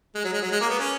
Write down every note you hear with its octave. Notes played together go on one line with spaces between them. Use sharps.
G#3
F#3
G#3
F#3
G#3
A#3
B3
C#4